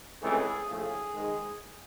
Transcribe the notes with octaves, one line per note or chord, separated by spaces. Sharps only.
C#2 C3 E3 A3 G#4
A#1 A2 F3 A3 G#4
G#2 D#3 G#3